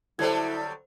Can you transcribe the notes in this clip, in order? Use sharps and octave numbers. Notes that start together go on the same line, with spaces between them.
D3 F#3 G3 E4 A4 C5 G#6